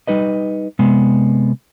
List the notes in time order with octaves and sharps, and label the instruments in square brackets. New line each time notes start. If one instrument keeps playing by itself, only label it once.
[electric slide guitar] G3 D#4 B4 D#5
C3 G#3 B3